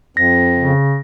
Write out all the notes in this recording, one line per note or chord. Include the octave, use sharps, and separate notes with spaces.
F2 A#6
C#3